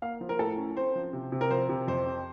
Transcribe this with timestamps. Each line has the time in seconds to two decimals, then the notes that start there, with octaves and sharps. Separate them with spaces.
0.02 A#3 F5
0.21 F3
0.29 A#4
0.39 A2 A4
0.57 C#4
0.77 C4 C5
0.96 F3
1.13 C3
1.32 C3
1.41 A#4
1.51 F3 C5
1.69 C3
1.87 F2 C5
2.06 C4